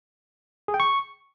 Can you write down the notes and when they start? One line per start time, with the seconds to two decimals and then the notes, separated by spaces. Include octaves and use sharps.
0.68 G#4
0.74 G5
0.80 C#6